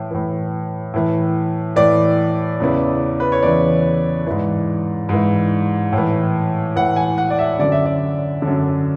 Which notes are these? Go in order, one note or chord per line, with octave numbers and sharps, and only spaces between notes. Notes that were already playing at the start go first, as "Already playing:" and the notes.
Already playing: A2 E3
A2 E3
A2 E3
A2 E3 D5
E2 C#3 E3
B4
C#5
E2 C#3 E3 D5
G#2 E3
G#2 E3
A2
E3
A2 E3 F#5
G#5
F#5
D5
E5
F#2 D3 D5
E5
D5
D3
F#2